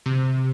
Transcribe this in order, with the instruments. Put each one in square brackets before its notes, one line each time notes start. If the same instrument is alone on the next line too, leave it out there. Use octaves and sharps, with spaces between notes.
[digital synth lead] C3